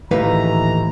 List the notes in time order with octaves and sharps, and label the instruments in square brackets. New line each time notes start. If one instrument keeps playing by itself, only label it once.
[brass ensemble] A#1 E3 A#5 [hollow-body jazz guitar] D#2 A2 B4